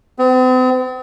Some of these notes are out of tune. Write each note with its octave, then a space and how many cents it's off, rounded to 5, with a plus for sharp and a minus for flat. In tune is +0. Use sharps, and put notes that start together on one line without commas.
C4 -45